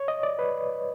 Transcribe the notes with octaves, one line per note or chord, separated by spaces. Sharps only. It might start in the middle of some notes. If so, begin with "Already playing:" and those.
Already playing: C#5
D#5
D5
B4